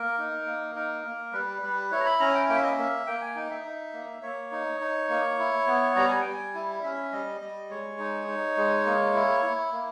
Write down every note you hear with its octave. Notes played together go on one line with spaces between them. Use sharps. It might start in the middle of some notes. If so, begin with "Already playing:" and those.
Already playing: A#3 A#4
D#4
A#3
D#4 A#4
A#3
G3 B4
G3
E4 C#5
A#5
B5
C#4 A#5
G5
A#3 G5
E5
D#5
E5
A#3
A#3 G5
G#5
D#4 G5
E5
D#4
A#3
A#3 C#5
D#4
D#4
A#3
E4
B3
G3 A#5
G#5
G3 G5
G#5
E4
C#4 E5
G3 D#5
G3 D#5
G#3 C#5
D#4
D#4
G#3
A#3
E4
E4
A#3